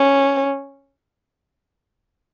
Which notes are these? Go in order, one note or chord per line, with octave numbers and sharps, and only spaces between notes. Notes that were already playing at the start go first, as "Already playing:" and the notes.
Already playing: C#4